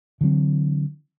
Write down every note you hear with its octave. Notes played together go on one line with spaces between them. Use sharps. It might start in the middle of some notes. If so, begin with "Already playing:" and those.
D3 E3 F#3 C4